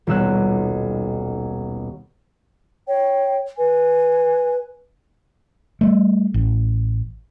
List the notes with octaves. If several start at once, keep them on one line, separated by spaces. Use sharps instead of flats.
D#1 B1 E6 F#6
C#5 G5
B4 G#5
G3 A3
A1